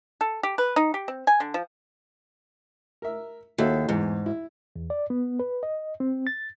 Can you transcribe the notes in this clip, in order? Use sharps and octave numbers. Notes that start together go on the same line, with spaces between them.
A4
G4
B4
D#4
G4
C4
G#5
D3
F3
A#4 E5
D#2 F#4 A4 E5
E2 G#2
E4
E2
D5
B3
B4
D#5
C4
A6